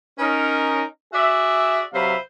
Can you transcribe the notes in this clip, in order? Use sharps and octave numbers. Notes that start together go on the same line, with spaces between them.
C#4 D#4 A#4
F#4 G#4 D5 E5
C3 F#3 B4 C5 E5 F5